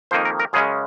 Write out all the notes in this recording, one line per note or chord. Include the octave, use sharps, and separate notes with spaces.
F2 D#3 A#3 D#4 C5
A#4
A#4
F#2 C#3 G#3 C#4 G#4